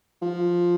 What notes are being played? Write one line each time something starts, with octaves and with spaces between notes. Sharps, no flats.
F3